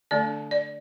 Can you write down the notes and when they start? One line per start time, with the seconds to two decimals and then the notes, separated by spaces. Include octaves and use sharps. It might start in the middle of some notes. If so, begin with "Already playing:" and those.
0.11 D3 A3 D4 D5
0.51 D5